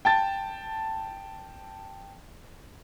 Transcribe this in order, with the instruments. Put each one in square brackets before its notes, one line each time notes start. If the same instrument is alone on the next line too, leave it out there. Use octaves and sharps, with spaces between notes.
[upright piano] G5 A5 A6